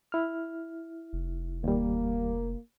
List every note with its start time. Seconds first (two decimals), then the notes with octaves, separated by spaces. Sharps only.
0.12 E4 F6
1.13 F1
1.64 D#2 G3 A#3